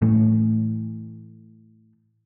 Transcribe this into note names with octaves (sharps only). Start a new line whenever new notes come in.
A2 E3 A3